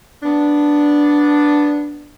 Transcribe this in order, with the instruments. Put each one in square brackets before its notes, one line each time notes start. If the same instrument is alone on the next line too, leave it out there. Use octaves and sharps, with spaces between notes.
[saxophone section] B3 D4